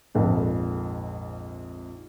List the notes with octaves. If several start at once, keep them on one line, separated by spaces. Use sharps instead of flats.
A#1 F2 G#2